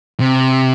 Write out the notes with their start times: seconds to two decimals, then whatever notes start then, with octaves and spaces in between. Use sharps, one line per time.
0.20 C3